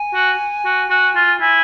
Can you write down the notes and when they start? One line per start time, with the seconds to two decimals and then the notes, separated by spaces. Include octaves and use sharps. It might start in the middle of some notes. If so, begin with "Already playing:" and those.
Already playing: G#5
0.14 F#4
0.65 F#4
0.90 F#4
1.16 F4
1.41 E4 G#5